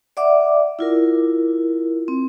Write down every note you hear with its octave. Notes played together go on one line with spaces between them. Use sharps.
D5 E5 F#5 D6
E4 F4 A#4
C4